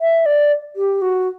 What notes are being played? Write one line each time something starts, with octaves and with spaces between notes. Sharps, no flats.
E5
D5
G4
F#4